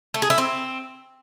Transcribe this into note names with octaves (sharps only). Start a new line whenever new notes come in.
A3
G#4
E4
C4